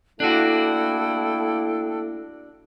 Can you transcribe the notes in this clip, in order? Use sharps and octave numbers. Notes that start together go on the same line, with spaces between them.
A3 A#3 D4 E4 F#4 A4 G5